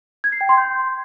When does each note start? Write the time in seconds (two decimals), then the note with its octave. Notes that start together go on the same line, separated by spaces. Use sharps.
0.24 G#6
0.32 C7
0.41 G5
0.49 C6
0.57 G6